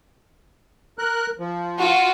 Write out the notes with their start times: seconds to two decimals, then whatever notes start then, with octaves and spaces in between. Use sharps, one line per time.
0.98 A#4 F#6
1.39 F3
1.78 F4 F#4